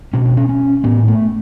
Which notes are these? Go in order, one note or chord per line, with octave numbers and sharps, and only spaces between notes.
B2 C#4
D4
C#4
C#4
A2 B3
A3